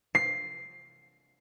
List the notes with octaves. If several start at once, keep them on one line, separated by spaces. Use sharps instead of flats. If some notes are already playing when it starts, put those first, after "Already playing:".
C7